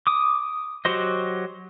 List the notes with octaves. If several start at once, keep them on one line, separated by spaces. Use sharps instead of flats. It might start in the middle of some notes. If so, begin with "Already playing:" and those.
D6 D#6
F#3 F#4 G4 C5 D#5